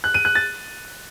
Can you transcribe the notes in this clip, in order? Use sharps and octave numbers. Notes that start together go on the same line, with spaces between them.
F#6
D#7
F#6
A6